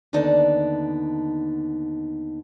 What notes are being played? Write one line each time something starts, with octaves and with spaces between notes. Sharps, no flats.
D#2 D3 B3 D#4 D5 A5